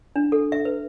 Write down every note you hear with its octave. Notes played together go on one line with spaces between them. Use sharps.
D4
A4
E5
B4